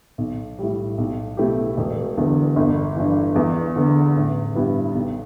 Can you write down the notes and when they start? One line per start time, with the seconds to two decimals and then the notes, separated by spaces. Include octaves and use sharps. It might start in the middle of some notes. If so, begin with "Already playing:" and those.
0.18 B1
0.59 A2 G3
0.98 B1
1.37 B2 A3 E4 G4
1.77 E1
2.17 E2 D3
2.56 G1
2.96 G2 E3
3.35 E2
3.76 D3 B3
4.16 A1
4.55 G2 G3 B3 E4
4.94 B1